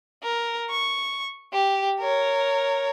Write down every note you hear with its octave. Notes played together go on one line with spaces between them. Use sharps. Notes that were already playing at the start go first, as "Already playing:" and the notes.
A#4
C#6
G4
A#4 C#5